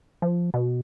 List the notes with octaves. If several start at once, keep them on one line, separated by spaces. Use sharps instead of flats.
F3
B2